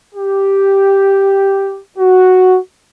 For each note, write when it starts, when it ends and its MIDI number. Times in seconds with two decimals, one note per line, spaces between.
0.15 1.79 67
1.98 2.57 66